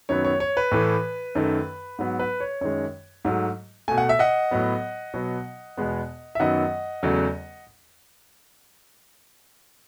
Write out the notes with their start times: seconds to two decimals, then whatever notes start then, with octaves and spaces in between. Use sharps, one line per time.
0.09 F#2 D#3 F#3 B3 C#5
0.25 C#5
0.40 C#5
0.57 B4
0.72 A2 E3 A3
1.35 F#2 D#3 A3
1.99 G#2 F#3 B3
2.19 B4
2.40 C#5
2.61 F#2 D#3 G#3 C#5
3.25 G#2 F#3 A3
3.88 B2 A3 G#5
3.98 F#5
4.09 E5
4.19 D#5 F#5
4.51 A2 F#3 B3
5.14 B2 F#3 B3
5.77 E2 B2 G#3 B3
6.35 E5
6.40 F#2 D#3 F#3 B3 D#5 F#5
7.03 E2 C#3 F#3 A3